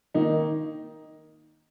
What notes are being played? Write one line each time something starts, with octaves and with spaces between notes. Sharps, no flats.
D#3 A#3 D#4